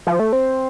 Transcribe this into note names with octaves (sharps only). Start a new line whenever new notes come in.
F3
A3
C4